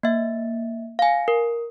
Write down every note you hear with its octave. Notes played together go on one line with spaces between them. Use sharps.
A#3 E5
F5 G#5
A#4